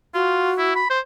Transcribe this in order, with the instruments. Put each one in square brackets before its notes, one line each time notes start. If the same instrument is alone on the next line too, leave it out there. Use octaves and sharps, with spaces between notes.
[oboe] F4 [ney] F#4
[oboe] E4
B5
C5